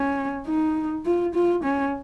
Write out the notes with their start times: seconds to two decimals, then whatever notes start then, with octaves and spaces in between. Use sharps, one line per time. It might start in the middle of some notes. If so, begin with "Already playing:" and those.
Already playing: C#4
0.47 D#4
1.06 F4
1.35 F4
1.64 C#4